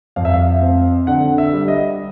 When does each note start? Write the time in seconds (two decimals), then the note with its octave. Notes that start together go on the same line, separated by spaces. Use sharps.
0.16 F2 F5
0.25 E5
0.33 F5
0.62 C4
1.07 D3 F#5
1.38 E5
1.53 G3
1.68 D#5